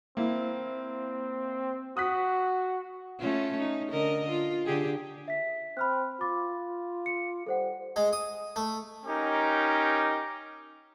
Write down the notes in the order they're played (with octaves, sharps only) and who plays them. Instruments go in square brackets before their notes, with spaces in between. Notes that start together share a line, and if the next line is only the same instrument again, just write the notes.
[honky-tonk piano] A#3 E4 [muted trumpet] C4
[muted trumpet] F#4 [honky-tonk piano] D#6 F#6 B6
[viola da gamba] A3 C#4 F4
D#4
D3 A#4 D#5
F4
D3 G4 G#4
[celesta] E5 B6
[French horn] C4 [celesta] B5 F6 F#6
[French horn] F4 [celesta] B5 D6 A6
[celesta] C#7
[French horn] G3 [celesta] A4 C5 F#5
[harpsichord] G#3
D#6
A3
[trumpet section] C#4 D#4 G4 A#4